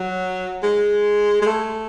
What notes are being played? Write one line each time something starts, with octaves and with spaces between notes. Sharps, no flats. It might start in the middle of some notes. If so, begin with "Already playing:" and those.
Already playing: F#3
G#3
G#3
A3